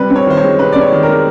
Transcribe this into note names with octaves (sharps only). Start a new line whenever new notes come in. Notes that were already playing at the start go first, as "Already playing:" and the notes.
Already playing: C3 G3 B4
C4
C#5
D#3 C5
C#5
G#3
C3 B4
C4 D5
C#5
D#3
A#4
G#3